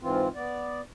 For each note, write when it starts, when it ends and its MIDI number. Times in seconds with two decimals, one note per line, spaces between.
0.02 0.28 44
0.02 0.28 52
0.02 0.28 60
0.02 0.28 65
0.35 0.81 59
0.35 0.81 74